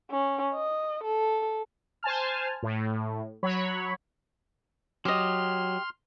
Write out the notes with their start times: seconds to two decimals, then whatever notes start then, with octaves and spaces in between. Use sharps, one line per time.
0.11 C#4
0.54 D#5
1.03 A4
2.03 C5 G#5 A5 F6
2.63 A2
3.43 F#3 C#5 B5
5.05 F#3 G4 D#5 C6 F6